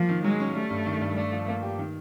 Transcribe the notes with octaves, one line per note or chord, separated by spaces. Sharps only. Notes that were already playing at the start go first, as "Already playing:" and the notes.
Already playing: F3 A#3
D#3
F#3 G#3
C#4
G3 A3
G2
D#3
G2
A3 D4
F3
A#3
G4
D#3